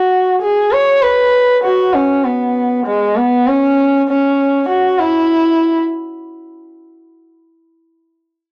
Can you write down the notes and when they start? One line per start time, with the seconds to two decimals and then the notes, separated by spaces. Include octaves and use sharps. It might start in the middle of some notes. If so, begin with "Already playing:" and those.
Already playing: F#4
0.42 G#4
0.72 C#5
1.02 B4
1.64 F#4
1.94 C#4
2.25 B3
2.86 G#3
3.16 B3
3.47 C#4
4.08 C#4
4.69 F#4
4.99 E4